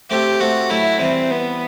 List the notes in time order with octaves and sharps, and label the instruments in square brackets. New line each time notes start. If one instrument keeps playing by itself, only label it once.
[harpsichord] A3 C4 [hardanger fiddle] G4
[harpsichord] A3 C4 [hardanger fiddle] F#4
[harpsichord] F#3 A3 [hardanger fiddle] E4
[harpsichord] E3 G3 [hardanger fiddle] C4
[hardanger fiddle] B3